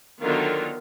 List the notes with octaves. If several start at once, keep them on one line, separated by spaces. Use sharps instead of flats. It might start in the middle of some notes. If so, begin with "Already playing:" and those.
D3 D#3 F#3 B3 F4 A#4